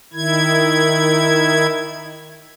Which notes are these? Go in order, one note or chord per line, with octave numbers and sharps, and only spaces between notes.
D#3 E4 G#6